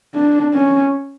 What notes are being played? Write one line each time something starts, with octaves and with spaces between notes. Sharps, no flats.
D4
C#4